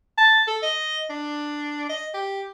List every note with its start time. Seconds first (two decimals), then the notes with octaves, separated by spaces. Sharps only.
0.18 A5
0.47 A4
0.63 D#5
1.10 D4
1.89 D#5
2.14 G4